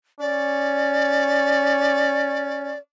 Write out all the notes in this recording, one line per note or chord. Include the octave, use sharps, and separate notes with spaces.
C#4 D5